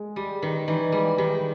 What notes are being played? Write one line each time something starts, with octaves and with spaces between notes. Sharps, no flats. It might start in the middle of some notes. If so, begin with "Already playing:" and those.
Already playing: G#3
G3 G4
D#3 B4
E3 D#4
G3 G#3
D#3 G4